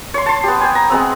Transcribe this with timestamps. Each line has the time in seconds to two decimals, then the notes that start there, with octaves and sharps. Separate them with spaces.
0.14 C#5 C6
0.26 A5 C6
0.44 B3 G4
0.61 G5 G#5
0.75 A#5
0.90 G#3 B3 C4